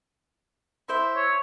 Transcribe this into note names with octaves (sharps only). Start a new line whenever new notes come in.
E4 C5 E5
C#5